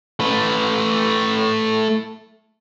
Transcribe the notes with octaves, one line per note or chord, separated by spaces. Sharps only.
A3 B4